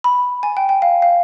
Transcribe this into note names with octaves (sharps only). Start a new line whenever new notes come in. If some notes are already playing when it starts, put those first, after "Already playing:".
B5
G#5
G5
G5
F5
F5